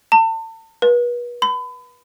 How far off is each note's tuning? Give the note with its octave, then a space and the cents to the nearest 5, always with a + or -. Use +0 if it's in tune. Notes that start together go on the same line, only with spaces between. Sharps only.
A5 +35
B4 -35
B5 +35